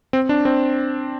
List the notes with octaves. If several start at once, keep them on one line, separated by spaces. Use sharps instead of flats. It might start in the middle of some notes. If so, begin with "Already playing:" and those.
C4
D4
C4